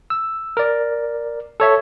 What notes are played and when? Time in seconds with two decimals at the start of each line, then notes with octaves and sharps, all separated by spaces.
0.10 E6
0.57 A#4 D5
1.60 A4 C#5 E5